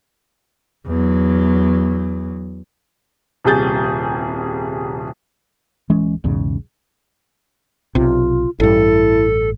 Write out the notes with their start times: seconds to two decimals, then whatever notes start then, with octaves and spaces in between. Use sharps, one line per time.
0.86 E2 F#3
3.44 D#1 C2 G3 G#4 G6 A6
5.90 D1 E3 G#3 C#4
6.24 B1 E2 G#2 C#3
7.95 B1 C3 F4
8.60 A1 G2 E4 A4